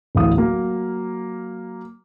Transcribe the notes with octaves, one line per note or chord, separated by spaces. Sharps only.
D1 A1 E4 F5 D#6
F#3 A#3